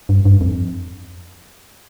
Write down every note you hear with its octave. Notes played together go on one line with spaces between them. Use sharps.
G2
G2
F2